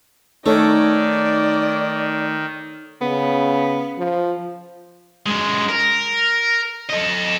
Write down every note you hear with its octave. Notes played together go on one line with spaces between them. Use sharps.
D#3 A3 D#4 A4 C#5 D5
C#3 B3
F3
F#2 G#3
A#4
A4 D#5